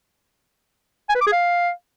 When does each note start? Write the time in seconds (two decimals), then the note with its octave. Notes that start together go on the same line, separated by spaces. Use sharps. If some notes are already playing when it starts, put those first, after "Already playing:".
1.09 G#5
1.15 B4
1.21 D6
1.27 G#4
1.32 F5